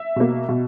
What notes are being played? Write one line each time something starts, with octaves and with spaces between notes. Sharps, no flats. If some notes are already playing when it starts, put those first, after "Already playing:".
Already playing: E5
B2 A#3
B2